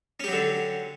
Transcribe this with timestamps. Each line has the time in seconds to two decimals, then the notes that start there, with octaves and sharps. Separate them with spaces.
0.20 C#4
0.24 G4
0.28 F#3
0.33 D3